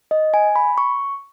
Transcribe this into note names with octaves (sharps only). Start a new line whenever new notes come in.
D#5
G#5
B5
C#6